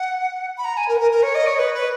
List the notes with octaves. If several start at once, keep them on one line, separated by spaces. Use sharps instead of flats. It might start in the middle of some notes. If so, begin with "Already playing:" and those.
Already playing: F#5
B5
A#5
G#5
A#4
B4
A#4
A#4
C#5
D#5
C#5
B4
B4